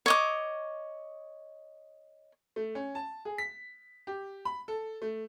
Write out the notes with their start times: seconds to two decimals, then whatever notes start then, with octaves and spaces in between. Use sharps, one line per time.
0.06 C#5 D#5 D6
2.56 A3
2.75 C#4
2.95 A5
3.25 G#4
3.38 B6
4.07 G4
4.45 B5
4.68 A4
5.02 A3